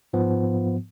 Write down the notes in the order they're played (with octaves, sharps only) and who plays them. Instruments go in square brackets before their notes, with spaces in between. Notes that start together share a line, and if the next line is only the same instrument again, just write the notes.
[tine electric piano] G#2 F3 B3